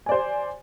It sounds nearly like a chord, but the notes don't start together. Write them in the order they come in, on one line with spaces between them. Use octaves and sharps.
G#5 D5 C5